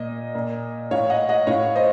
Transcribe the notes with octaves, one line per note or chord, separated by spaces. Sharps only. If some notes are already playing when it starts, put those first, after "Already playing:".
Already playing: A#2 D#5
A#2
A2 C#5 F5
D#5 F#5
D#5 F#5
A2 C#5 F5
C5 D#5